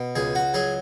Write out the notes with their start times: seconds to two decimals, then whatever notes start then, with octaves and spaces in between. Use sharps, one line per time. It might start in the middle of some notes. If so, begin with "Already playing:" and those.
Already playing: B2
0.16 C#2 G#4
0.35 F#4
0.54 F#3 G#4